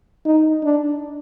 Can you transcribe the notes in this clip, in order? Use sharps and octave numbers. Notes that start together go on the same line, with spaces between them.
D#4
D4